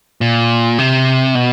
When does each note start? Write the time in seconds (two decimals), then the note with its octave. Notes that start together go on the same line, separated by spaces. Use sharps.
0.21 A#2
0.78 C3
1.35 B2